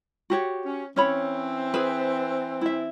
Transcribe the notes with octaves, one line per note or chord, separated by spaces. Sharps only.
F#4 G4 C#5
C#4
E3 C4 C#4 C#5 B5
G#4 B4
E4 E5